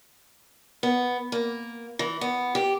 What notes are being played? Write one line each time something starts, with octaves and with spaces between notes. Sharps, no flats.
B3
A#3
E3
B3
G4